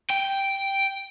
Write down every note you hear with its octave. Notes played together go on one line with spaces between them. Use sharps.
G5